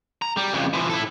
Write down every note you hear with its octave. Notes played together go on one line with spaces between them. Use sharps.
A#5
G3
F2 C#3
E3 F3
E4 A4